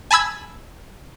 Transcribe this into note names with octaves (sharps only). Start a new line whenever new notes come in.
G#5 A5 B5 E6 G#6